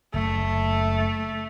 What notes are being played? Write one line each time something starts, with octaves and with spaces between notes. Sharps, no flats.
F#1 F#2 A3